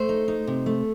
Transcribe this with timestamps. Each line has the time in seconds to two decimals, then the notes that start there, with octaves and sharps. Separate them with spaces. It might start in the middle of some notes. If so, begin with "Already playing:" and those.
Already playing: A3 C5
0.09 D#4
0.28 D#4
0.47 C3
0.66 A3